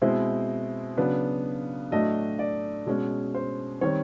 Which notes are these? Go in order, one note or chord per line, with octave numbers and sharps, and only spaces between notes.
B2 G#3 C4 E4
C#3 F#3 B3 D4
A2 F#3 A3 D4 D#5
D5
B2 G#3 C#4
C5
D#3 G3 C4 C#5